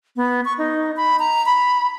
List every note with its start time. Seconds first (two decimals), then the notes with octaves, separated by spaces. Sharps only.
0.16 B3
0.45 C#6
0.58 D#4
0.96 B5
1.19 A#5
1.46 B5